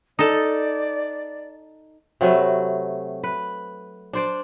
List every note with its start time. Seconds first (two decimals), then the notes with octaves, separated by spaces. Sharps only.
0.19 D#4 A4 D5
2.21 C3 F#3 A3 B4
3.24 B4
4.13 D4 C5 D5